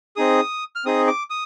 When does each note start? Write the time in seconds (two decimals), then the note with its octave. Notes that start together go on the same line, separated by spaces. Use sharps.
0.16 C4 D#4 G#4 D#6
0.76 F6
0.85 C4 D#4 G#4 D#6
1.07 D6
1.30 D#6